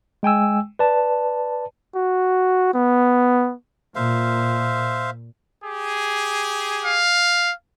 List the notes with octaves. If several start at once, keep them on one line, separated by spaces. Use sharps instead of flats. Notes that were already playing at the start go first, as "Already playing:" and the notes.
G#3 G5 G#5 E6
B4 D5 A5
F#4
B3
A#2 C5 E5 F5
G4 G#4
F5